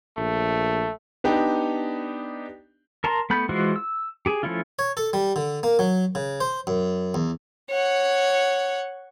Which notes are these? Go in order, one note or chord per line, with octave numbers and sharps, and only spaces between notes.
A#1 A3
B3 D4 D#4 G4
A#4 A5 A#5 C6
A3 B3 B5 G6
E3 G#3 F4 F#4 C5
E6
G4 G#4
F3 A3 C#4 E4 F4
C#5
A4
G3
D3
A#3
F#3
C#3
C5
F#2
E2
C#5 F#5